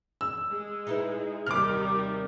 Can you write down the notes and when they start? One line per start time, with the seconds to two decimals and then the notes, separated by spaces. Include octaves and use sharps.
0.21 E6
0.50 G#3
0.87 D#4 E4 B4
1.47 D#2 C3 D#3 G3 D#4 D6 F6